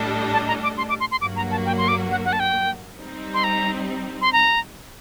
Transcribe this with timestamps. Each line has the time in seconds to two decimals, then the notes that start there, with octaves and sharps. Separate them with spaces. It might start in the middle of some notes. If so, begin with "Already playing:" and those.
Already playing: A2 G3 D4 A4 D#5
0.33 A5
0.47 A#5
0.63 D6
0.78 C6
0.89 D6
1.00 C6
1.11 C6
1.21 G2 F#3 A#3 F#4 D6
1.36 A#5
1.51 A5
1.66 G5
1.78 C6
1.88 D6
2.11 F#5
2.25 F#5
2.33 A5
2.40 G5
2.99 G3 C4 D#4
3.34 C6
3.44 A#5
4.21 C6
4.33 A#5